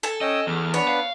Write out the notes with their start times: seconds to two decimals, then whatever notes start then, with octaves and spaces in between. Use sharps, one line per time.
0.03 A4 G#5
0.21 C#4 D#5 G5 E6
0.47 E2 F6
0.74 B3 D4 B4 C#5
0.89 F5